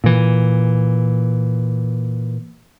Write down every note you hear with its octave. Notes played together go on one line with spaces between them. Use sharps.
A#2 E3